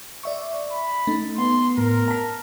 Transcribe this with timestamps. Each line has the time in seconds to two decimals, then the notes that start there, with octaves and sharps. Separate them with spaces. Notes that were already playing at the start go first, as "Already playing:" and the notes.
0.23 D5 E5 C#6
0.71 B5
1.07 A3 D#4
1.38 B3 C6
1.78 A2 A#4
2.08 A5 A#5 B6